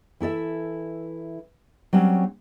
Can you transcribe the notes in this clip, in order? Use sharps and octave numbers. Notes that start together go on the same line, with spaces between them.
E3 E4 A4 E5
F#3 G3 C4 C#4